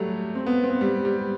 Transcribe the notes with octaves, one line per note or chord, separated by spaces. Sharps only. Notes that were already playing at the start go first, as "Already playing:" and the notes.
Already playing: F#3 G3 A3
C4
B3
C4
B3
G3
G3